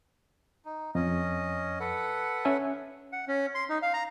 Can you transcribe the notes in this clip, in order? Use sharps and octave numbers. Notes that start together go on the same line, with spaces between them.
D#4
F2 C#4 D#5
A4 B4 F#5
C#4 E5 G#5
F#5
C#4
C6
D#4
F5
A#5